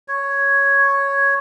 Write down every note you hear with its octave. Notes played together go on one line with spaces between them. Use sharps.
C#5